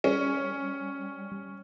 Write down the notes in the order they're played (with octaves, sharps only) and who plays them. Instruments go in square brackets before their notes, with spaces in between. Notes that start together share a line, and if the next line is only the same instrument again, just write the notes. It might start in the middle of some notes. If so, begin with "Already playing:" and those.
[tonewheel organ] G3 [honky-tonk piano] C#4